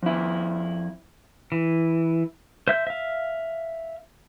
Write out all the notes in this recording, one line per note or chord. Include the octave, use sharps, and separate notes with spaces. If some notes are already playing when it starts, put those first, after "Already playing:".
F2 E4
E3
C5 E5 G6
E5 F5